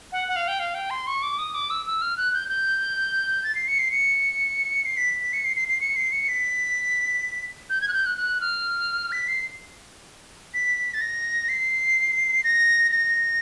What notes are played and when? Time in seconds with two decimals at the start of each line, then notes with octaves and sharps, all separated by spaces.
0.12 F#5
0.28 F#5
0.36 F5
0.48 G5
0.59 F5
0.75 G5
0.90 C6
1.07 C#6
1.23 D6
1.38 D#6
1.55 D6
1.70 E6
1.86 E6
2.02 F6
2.17 F#6
2.34 G6
2.48 G6
3.44 A6
3.55 C7
3.68 C#7
3.79 C7
3.91 C#7
4.86 C7
4.97 B6
5.21 B6
5.33 C#7
5.45 C7
5.56 C7
5.68 C7
5.81 C#7
5.96 C7
6.12 C#7
6.28 B6
7.70 G6
7.81 G#6
7.88 F#6
7.93 G6
8.06 F#6
8.17 F#6
8.41 F6
9.12 B6
9.28 C7
10.54 B6
10.94 A6
11.01 A#6
11.49 C7
12.44 A#6
12.91 A#6